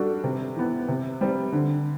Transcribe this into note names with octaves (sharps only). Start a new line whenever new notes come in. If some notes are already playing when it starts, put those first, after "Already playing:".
Already playing: G3 D4 F#4 A4
C3
E3 B3
C3
G3 C4
D3